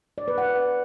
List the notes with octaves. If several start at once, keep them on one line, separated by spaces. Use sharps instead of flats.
D5
B4
F#5